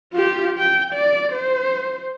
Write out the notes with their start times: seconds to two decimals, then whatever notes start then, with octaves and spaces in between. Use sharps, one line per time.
0.13 F4 G4
0.58 G5
0.94 D5
1.33 C5